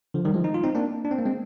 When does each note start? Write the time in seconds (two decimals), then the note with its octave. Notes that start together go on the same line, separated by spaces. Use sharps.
0.14 D3 F3
0.25 D#3 G3
0.34 F3 G#3
0.44 D#4
0.54 F4
0.64 C4 D#4
0.75 A#3 D4
1.05 D4
1.11 C4
1.18 A#3
1.25 G#3 C4